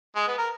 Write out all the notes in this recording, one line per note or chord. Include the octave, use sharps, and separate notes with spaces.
G#3
B3
A#4